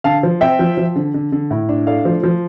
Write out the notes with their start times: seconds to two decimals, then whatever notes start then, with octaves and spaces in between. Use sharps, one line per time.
0.04 D3 F5 A5
0.23 F3
0.41 C4 E5 G5
0.59 F3
0.78 F3
0.96 D3
1.14 D3
1.32 D3
1.51 A2
1.69 D4
1.87 A3 D5 F5
2.05 F3
2.23 F3